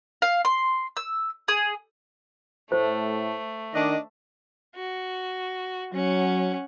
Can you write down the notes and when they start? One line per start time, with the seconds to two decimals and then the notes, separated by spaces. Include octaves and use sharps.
0.22 F5
0.45 C6
0.97 E6
1.48 G#4
2.72 A2 A3 C5
3.74 D#3 D4 D#5
4.75 F#4
5.93 F#3 C#4 F#5